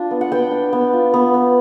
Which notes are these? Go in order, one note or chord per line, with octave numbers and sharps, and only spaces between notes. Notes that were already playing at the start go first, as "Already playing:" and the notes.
Already playing: D4 F4
B3
F#5
B3 G5
D4
B3
F4
B3
B3